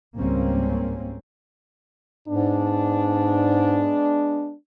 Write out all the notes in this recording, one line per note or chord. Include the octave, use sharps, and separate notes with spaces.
G#1 C#2 G3 A#3 C4 C#4
G#2 G#3 B3 D4